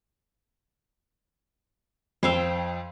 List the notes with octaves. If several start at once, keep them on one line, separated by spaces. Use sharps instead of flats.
F2 C5 F5 G5 E6